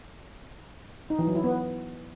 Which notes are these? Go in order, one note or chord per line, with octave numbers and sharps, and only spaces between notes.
D#4
E3
F#3
E4
B3